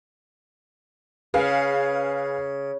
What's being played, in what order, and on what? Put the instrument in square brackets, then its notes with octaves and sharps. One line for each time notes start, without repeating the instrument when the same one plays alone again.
[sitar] C#3 [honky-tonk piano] G#4 B4 F5